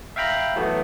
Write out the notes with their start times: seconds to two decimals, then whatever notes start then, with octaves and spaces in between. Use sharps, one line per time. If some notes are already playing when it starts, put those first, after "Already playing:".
0.16 E5 F5 G5 A#5 B5
0.56 E3 F#3 A3 B3